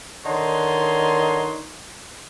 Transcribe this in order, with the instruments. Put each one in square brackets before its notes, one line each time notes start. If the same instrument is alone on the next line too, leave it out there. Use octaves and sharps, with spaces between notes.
[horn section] D3 D#3 D#4 C#5 C6